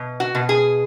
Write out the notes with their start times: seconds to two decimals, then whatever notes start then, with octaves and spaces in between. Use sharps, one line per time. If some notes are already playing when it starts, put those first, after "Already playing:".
Already playing: B2
0.20 F#4
0.35 B2
0.49 G#4